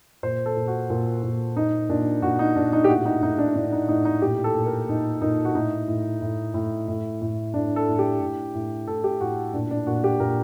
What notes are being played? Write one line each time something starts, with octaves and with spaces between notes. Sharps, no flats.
A#2 C5
A4
A#2
F#4
A#2
A#2
A#2 D#4
A#2 D4
A#2 F#4
D#4
A#2 D4
D#4
G4
A2 F#4
D#4
A2 D#4
D4
A2 D4
D#4
A2 D#4
D#4
A#2 G4
A4
A#2
A#4
A#2 D#4
A#2 D#4
F#4
A2 D#4
A2
A2
A2
A2
A2
A2 D4
A4
A2
G4
A2
A2
A2 A4
G4
A2 F#4
A#2 D4
D4
A#2 F#4
G4
A#2 A#4